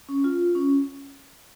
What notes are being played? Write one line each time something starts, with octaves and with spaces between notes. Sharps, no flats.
C#4
F4
C#4